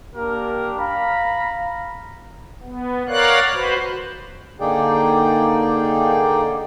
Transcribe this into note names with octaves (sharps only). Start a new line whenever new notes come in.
A#3 D4 G4 A#4
F5 A#5 B5
B3
A#4 C#5 D5 F5 F#5 F#6
F#4 B4 C5
D3 A#3 D#4 G#4 D5 G5